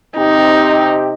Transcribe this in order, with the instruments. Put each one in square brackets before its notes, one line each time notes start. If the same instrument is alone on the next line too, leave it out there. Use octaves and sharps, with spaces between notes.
[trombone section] C3 C4 G4 [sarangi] D#4